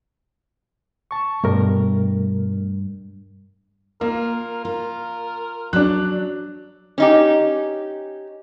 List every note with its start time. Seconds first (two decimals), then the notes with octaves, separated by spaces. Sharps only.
1.11 A5 C#6
1.44 G2 B2 A3 A#4
4.01 A#3 F4 A#4
4.65 F4 A#4
5.73 F#3 D4 F#6
6.98 C#4 D#4 G4